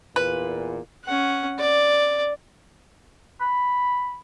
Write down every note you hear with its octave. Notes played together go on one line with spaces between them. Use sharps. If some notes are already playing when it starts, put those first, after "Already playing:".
E2 A#2 B4
C#4 F#5
D5
B5